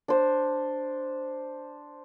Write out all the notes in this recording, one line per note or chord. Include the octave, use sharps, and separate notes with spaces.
D4 C5